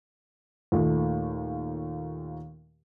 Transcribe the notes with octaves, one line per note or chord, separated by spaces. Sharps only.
D#2 A#2 A3